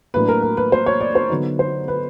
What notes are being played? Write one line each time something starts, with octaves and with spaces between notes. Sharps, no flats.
A2 F#3 A#3 D4 B4
A#4
A#4
B4
C5
C#5
D5
C5
D3 F#3 B3 D#4
C5
B4